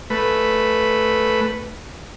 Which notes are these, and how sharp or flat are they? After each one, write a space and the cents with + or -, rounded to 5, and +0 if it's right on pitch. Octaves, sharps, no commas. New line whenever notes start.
A3 +0 B4 +0